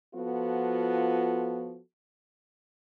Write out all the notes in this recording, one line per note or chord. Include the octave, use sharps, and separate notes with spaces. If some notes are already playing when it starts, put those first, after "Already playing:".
F3 B3 F4 F#4 A4